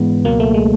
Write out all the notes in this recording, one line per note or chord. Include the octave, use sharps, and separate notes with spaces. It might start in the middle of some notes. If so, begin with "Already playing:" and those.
Already playing: G#2 E3 G#3 B3
C#2 B2 F#3 A#3
A3
G#3